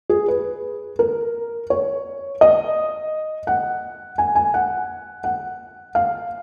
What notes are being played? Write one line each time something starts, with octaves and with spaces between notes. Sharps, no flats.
G#4
B4
A#4
C#5
D#5
F#5
G#5
G#5
F#5
F#5
F5